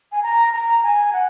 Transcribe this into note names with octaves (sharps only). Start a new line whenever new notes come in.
G#5
A#5
A#5
G#5
F#5